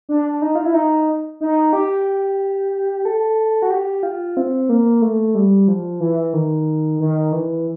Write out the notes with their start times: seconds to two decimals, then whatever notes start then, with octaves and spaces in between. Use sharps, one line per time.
0.09 D4
0.42 D#4
0.55 F4
0.65 E4
0.74 D#4
1.41 D#4
1.73 G4
3.05 A4
3.62 F#4
3.70 G4
4.03 F4
4.37 C4
4.69 A#3
5.02 A3
5.35 G3
5.68 F3
6.00 E3
6.33 D#3
7.00 D#3
7.32 E3